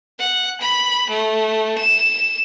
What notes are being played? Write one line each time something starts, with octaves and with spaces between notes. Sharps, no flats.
F#5
B5
A3
E7